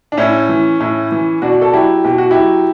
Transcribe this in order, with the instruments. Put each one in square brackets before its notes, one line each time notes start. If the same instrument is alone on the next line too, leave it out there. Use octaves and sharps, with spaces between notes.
[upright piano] D4
A2 C#4 E4
E3
A2
E3
B2 D4 F#4
A4
F#3 E4 G4
B2 G4
F#4
E4 G4
F#3